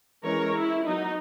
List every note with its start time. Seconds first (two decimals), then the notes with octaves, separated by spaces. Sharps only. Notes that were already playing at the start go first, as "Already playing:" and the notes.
0.23 E3 G#3 C#4 A#4 C#5
0.54 E4
0.85 F#3 B3 D#4